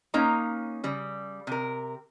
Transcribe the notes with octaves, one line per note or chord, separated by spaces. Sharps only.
A#3 C#4 D#4 A#5
C#3 G3
C3 A#4